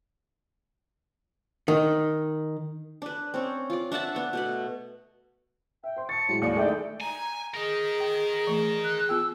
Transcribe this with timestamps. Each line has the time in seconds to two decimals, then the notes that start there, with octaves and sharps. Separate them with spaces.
1.68 D#3
3.02 D4 B4
3.34 C4 C#4 C#5
3.70 F4 D5
3.92 D4 E5 F#5 A5
4.14 B3 C#6
4.33 B2 A3 B5
5.84 E5 G5
5.96 C5 C6
6.09 A5 C#6 A6 C#7
6.28 A2 F#3 G#3
6.42 D#2 D5
6.56 D#3 G#3 A3 D#4 E4 G5
7.01 G#5 A#5
7.54 G#4 A#4 D#5
8.00 G5
8.47 E3 A3
8.84 F#6
9.09 B3 F4 G5 E6